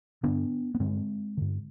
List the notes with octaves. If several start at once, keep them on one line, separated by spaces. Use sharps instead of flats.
G2 D3 B3 D4
B3
G2 D3 G#3 C4
G2 D3